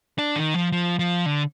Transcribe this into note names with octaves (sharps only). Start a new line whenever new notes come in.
D4
D#3
F3
F3
F3
D3